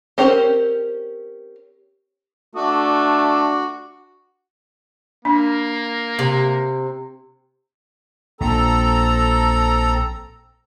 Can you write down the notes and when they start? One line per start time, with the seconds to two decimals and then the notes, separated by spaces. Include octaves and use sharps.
0.18 C4 C#4 G4 A#4 C5
2.55 A3 D4 F#4 D6
5.25 A#3 D4
6.19 C3
8.41 A#1 C4 A4 A#5